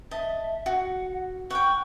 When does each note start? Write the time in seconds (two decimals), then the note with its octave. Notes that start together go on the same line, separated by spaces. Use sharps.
0.11 D#5 E5 A5
0.66 F#4 F#5
1.50 F#5 G5 C#6